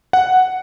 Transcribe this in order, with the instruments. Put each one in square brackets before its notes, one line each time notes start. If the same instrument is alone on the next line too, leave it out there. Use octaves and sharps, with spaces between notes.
[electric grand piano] F#5